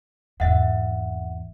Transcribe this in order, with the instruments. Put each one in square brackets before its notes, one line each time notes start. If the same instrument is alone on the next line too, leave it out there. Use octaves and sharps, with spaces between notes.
[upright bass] G#1 E2 [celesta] E5 F#5